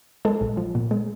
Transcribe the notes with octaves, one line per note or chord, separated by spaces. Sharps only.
G#3 A4
A#1
F3
A#2
G#3